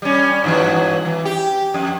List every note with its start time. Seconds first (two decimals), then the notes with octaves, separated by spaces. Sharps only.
0.02 G3 C#4
0.44 G2 E3 F#3
1.05 E3
1.25 G4
1.74 F2